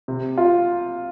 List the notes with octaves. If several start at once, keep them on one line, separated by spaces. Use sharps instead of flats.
C3
F4